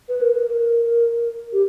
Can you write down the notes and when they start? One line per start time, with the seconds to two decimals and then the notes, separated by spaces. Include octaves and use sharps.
0.09 B4
0.21 A#4
0.34 A#4
0.47 A#4
1.52 G4